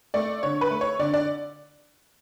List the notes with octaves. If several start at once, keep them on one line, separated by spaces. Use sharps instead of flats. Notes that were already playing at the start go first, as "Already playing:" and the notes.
A3 D5
D3 C#5
B4
A3
C#5
D3 D5
D5